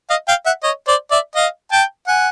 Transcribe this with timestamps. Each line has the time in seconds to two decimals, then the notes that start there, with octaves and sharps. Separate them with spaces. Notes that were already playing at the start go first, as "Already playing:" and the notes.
0.10 D#5 F5
0.28 F5 G5
0.46 E5 F#5
0.63 C#5 D#5
0.87 C5 D5
1.11 D5 E5
1.35 D#5 F5
1.72 G5 A5
2.08 F#5 G#5